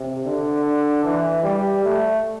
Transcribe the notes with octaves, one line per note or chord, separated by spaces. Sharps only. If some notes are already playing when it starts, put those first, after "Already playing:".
Already playing: C3
D3
E3
G3
A3